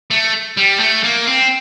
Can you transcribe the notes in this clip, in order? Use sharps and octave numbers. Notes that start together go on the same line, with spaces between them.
A3
G3
A3
A#3
C4